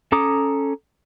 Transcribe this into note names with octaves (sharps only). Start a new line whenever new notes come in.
C#4 A4 A#5 D6 D#6